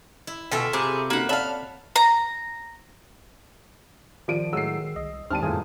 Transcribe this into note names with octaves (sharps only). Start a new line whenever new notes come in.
E4
B2 F4 A4 E5 G5 G#5 E6
C3 G#4 A#5 B5 D6
A#3 C#4 D#4 F#4 F#5 B5
C#5 D5 E5 F5 A5 B5
A#5
D#3 F3 D5 D7 D#7
A2 F#3 G#3 E6 C7
C2 D#5
G#1 D#2 G3 C4 A5 F6 D#7
G1 F2 A2 F4 G#4